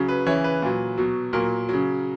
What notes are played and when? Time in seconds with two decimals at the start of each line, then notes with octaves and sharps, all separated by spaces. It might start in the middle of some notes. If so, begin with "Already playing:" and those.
Already playing: C#3 F#3
0.09 B4
0.27 C#3 E3 C#5
0.44 B4
0.62 A#2 F#3
0.98 B2 F#3
1.33 A#2 F#3 A#4
1.69 C#3 F#3